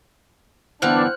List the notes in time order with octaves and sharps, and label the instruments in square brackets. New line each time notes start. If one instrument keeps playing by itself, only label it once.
[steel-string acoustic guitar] G2 D3 E3 [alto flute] B3 [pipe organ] D4 [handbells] C5 F6 F#6